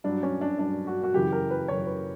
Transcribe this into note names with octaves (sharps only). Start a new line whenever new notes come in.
G2 F#3 D4
C#4
D4
G2 F#3 D4
F#4
F#4
F#2 C#3 E3 G4
A#4
B4
F#2 C#3 E3 C#5
B4